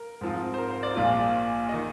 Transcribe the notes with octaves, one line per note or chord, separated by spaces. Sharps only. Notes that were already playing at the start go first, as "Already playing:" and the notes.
Already playing: A#4
G#2 F3 C4 F4
C5
A#4
C5
D5
A#1 A#2 F3 A#3 F4
D#3 D#5